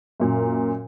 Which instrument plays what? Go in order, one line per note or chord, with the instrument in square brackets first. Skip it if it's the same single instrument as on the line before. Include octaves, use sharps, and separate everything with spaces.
[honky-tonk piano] F#2 A#2